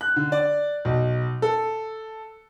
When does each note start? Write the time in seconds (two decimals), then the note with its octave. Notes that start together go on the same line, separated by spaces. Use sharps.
0.01 F#6
0.16 D3
0.32 D5
0.85 B1
1.42 A4